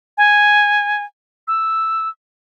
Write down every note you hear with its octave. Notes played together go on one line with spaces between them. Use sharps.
G#5
E6